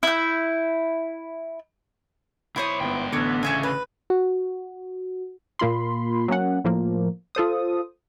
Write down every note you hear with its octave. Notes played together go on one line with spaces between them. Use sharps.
E4 G6
B1 E4 C5 C#5 D#6
G1 G#2 B3 G5
A1 D3 B3 C#5 D6
C#3 C#5 E5 G#5
B4
F#4
A#2 A#3 F4 B5 C6
F#3 A#3 C#4 F#5
A2 F3 A#3
F4 A4 C5 D#6